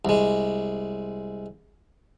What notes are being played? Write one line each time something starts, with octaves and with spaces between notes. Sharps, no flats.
C2 G#3